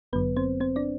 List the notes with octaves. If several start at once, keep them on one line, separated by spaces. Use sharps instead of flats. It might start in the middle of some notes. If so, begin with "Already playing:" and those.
G1 F#2 D3 F#3 B3 B4
C4 C5
C4 C5
D4 D5